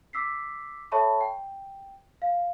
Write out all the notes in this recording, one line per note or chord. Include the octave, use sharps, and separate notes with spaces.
D6 E6 B6 C7
A4 C#5 E5 A5 B5 C#6
G5
F5